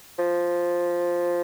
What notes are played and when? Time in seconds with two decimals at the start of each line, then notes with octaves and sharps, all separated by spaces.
0.18 F3